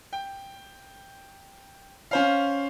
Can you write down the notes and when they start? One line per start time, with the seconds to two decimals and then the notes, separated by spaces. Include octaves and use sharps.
0.13 G5
2.11 C#4 C5 F5